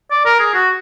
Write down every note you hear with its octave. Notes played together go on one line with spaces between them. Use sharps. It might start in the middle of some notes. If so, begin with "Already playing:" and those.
D5
A#4
G#4
F#4